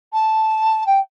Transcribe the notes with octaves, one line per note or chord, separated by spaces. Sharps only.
A5
G5